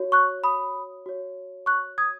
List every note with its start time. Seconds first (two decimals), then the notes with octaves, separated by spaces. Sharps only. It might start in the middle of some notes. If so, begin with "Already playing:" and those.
Already playing: F#4 C#5
0.12 C#6 F#6
0.44 B5 D#6
1.06 F#4 C#5
1.66 C#6 F#6
1.98 D#6 G#6